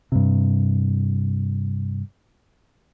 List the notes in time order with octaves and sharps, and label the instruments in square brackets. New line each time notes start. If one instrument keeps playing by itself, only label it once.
[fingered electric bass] G2 C3